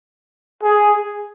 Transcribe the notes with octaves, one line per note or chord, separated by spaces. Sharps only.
G#4